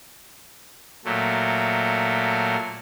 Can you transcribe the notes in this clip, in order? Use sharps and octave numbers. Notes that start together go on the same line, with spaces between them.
A#2 F#3 A3